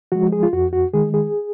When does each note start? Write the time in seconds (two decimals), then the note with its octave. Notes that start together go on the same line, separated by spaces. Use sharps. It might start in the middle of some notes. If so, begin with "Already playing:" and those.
0.12 F3 G#3 F#4
0.32 G#4
0.43 F4
0.53 F2 F#4
0.73 F#4
0.93 D#3 G#3 G#4
1.14 G#4